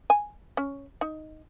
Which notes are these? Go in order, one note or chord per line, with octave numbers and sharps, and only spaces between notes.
G#5
C#4
D#4